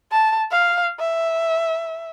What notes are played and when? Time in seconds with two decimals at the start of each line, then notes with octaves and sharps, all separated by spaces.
0.12 A5
0.52 F5
1.00 E5